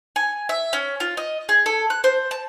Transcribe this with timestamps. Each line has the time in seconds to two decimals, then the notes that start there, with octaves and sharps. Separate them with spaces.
0.16 G#5
0.49 E5
0.73 C#4
1.00 F4
1.17 D#5
1.49 G#4
1.66 A4
1.90 F#6
2.04 C5
2.31 A5